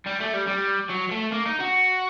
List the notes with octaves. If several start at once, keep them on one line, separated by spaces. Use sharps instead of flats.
G3
A3
G3
G3
F#3
A3
A#3
D#4
F#4